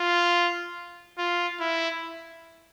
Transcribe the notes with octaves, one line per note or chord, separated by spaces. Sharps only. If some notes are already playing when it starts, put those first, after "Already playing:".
Already playing: F4
F4
E4